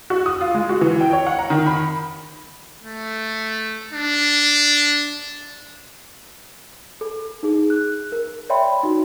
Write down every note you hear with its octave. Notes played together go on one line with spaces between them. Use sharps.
F#4
D#6
F4
G#3
F#4
E3
G5
C#5
F#5
A#5
D#3
B5
A3
D4
A4
D#4 G#4
F#6
A#4
C#5 D5 E5 G5 B5 C6
D#4 F#4